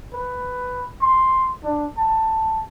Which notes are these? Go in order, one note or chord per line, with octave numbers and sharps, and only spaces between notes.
B4
C6
D4
A5